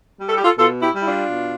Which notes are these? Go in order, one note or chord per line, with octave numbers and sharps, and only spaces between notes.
G3
A4
G4
F4 A4
B2 F4 A4
E4 G4
G3
E4
D4 F4
B2